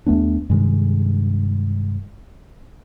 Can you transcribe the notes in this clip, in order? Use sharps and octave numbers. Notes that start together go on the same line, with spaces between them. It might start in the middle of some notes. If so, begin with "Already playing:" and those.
D#2 A3 B3 D4
G2 C3 D#3 G#3